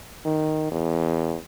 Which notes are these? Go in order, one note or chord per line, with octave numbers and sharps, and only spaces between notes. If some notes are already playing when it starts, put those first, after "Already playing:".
D#3
E2